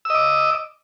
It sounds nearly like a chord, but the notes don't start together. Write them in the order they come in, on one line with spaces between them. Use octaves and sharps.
E6 D#5 D6